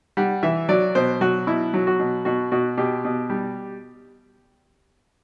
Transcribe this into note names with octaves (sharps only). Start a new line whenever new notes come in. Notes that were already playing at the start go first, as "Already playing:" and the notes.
G3 F#5
E3 E5
F#3 D5
B2 C5
F#3 F#4
B2 E4
F#3
F#4
B2
B2 F#4
B2 F#4
B2 G4
B2
G3